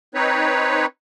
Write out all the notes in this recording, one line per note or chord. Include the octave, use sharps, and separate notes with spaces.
C4 D#4 B4 C#5